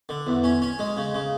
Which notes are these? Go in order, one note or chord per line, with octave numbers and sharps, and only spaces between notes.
D3
E2
C#4
C#4
G#3
C#3
C#3